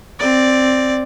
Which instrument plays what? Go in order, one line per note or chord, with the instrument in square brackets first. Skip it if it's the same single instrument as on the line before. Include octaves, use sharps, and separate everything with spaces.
[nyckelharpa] C4 D5